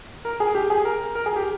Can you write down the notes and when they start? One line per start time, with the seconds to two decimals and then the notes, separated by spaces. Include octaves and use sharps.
0.25 A#4
0.40 G#4
0.55 G4
0.70 G#4
0.85 A#4
1.15 A#4
1.26 G#4
1.36 G4